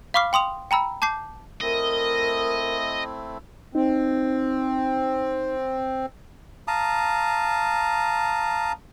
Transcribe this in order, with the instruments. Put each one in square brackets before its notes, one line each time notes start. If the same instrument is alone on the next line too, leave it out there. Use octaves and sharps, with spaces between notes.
[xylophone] F5 B5 C#6 D6 F6 C7
G5 C6 D#6 F7
G5 A#5 B5 E6
A5 D6 G6 C7
[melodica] A3 C4 E4 [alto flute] A#4 [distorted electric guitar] D#5
[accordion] C4 [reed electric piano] D#4
[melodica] F5 A5 A#5 D#6